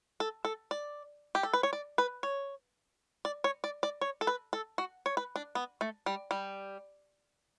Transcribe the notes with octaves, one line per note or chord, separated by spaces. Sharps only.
A4
A4
D5
G4
A4
B4
C#5
D5
B4
C#5
D5
C#5
D5
D5
C#5
A4
B4
A4
F#4
C#5
B4
D4
B3
A3
G3
G3